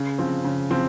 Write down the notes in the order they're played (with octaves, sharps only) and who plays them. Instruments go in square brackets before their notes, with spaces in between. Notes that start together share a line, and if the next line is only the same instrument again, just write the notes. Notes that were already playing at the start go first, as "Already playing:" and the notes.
Already playing: [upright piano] C#3
F3 C4
C#3
F3 C4